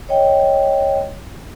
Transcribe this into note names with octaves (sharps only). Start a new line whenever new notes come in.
C#5 D#5 G5